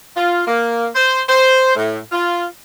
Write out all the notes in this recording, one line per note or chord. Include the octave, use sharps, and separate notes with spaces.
F4
A#3
C5
C5
A2
F4